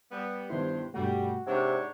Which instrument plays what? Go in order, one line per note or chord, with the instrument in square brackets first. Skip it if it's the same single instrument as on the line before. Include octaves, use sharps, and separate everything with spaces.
[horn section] G3 B3
[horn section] G2 C5 [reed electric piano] D#3 B3 E4
[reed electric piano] G2 B2 A3 [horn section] G3 [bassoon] F#4
[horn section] G#2 D4 C#5 [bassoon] C3 [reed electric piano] F#5